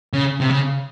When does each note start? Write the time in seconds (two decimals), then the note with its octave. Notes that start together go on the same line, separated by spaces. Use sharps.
0.13 C#3
0.41 C3
0.50 C#3